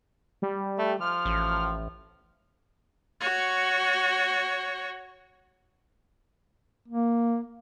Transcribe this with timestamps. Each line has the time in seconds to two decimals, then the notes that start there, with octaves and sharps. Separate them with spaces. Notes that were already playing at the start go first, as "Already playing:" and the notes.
0.42 G3
0.78 A3
1.00 F3 F6
1.25 A1
3.21 F#4 C#5
6.88 A#3